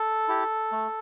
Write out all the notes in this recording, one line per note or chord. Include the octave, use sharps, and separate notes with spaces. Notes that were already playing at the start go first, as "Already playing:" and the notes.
Already playing: A4
E4 G4
A3